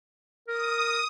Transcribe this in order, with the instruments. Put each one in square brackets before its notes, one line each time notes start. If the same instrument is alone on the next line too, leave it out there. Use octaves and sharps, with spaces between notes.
[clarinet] A#4 [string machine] D#6